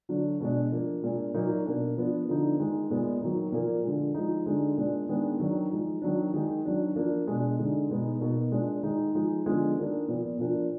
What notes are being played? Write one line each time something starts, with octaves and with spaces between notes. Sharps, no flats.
D3 F#3 D4
B2 G#3 D4
F3 A#3 D4
A#2 G#3 D4
A#2 F#3 A#3 D#4
B2 A#3 D4
F3 B3 D4
D3 F3 B3 D#4
D#3 G#3 D#4
A#2 G#3 B3
D#3 F#3 A#3 D#4
A#2 F3 A#3
D3 F3 G#3
F3 G#3 D#4
D3 G#3 D#4
A#2 G#3 D4
D#3 G#3 B3 D4
D#3 F#3 D4
F3 G#3 D#4
D#3 F#3 D4
D#3 G#3 D#4
D#3 F#3 D4
F3 A#3 D4
B2 G#3 D4
D3 G#3 D#4
B2 G#3 B3 D#4
B2 A#3 D#4
A#2 G#3 D4
D#3 G#3 D#4
F3 G#3 D#4
D3 F3 G#3 B3
D#3 A#3 D4
A#2 F3 B3
A#2 F3 A#3 D4